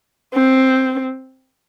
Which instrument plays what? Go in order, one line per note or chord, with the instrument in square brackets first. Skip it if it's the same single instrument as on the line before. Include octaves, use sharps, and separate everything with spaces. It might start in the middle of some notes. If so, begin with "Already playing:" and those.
[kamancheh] C4